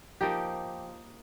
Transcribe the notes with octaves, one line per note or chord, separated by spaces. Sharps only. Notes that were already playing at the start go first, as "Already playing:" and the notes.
F3 A#3 D#4 G4